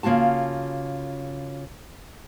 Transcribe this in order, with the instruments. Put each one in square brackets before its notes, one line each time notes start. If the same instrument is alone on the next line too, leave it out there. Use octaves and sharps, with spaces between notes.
[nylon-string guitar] C#3 A#3 F4 F#4 A5